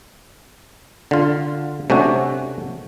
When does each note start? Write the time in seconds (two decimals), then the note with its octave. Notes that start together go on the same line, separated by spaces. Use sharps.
1.11 D3 F4
1.90 C3 A3 C#4 D4 F#4